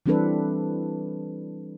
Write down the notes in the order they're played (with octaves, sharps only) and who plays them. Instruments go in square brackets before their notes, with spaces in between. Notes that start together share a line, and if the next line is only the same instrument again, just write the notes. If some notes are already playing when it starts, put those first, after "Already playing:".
[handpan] E3 G3 C4 D4 A4 B4